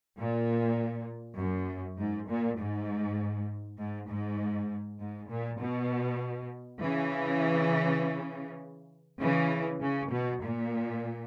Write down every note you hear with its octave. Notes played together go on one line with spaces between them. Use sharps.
A#2
F#2
G#2
A#2
G#2
G#2
G#2
G#2
A#2
B2
C#3 E3
C#3 E3
C#3
B2
A#2